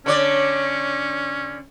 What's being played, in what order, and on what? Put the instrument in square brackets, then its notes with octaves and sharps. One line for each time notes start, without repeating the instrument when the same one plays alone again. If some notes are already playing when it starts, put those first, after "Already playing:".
[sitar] D3 C#5 D5 [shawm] C#4